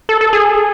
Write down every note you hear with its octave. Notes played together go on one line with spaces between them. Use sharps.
A4
A4
G#4